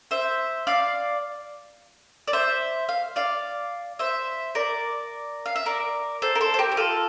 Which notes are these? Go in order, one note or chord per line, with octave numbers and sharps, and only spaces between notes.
C5 E5
D5 F5
D5
C5 E5
F5
D5 F5
C5 E5
A#4 D5
F5
E5
A#4 D5
A4 C5
A#4
A4 C5
C5
G4 A#4
G4
F4 A4